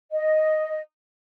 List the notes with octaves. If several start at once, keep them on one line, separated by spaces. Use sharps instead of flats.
D#5